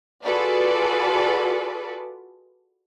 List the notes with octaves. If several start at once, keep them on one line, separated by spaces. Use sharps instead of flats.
F4 F#4 G#4 A4 B4 D5